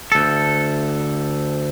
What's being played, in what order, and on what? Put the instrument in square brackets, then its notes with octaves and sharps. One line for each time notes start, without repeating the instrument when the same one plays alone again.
[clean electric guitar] D2 A4